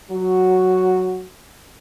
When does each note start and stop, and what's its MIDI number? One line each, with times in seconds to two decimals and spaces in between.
0.12 1.25 54
0.12 1.25 66